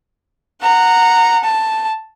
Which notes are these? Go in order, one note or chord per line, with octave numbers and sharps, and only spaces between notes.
F#5 A#5
A5